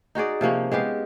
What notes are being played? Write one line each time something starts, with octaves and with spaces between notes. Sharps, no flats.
D#4 F#4 G#4 D5
C3 F3 A#3 C#4
G#3 B3 G4 F5